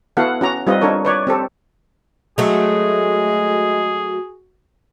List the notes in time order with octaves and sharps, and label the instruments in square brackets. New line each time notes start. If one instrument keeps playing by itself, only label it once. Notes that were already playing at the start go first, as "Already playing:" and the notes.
[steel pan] B3 E4 F#4 A4 F5 F#5
C#4 F#4 A#5
G3 C4 D#4 F4 B4 D#5
D4 D#4 A4 A#4 C#5
B4 C#5 D5
C4 G4 A4
[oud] F#3 A3 [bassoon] G#3 [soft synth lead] F#4 [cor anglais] G#4